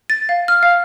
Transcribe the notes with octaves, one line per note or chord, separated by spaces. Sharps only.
A6
F5
F6
F5